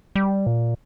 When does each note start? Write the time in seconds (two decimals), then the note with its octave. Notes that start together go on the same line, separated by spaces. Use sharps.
0.15 G3
0.46 A#2